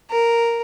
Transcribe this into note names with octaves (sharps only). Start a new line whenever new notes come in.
A#4